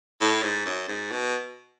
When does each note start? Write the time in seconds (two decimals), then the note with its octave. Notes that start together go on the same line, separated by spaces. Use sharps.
0.21 A2
0.43 G#2
0.66 F#2
0.88 G#2
1.11 B2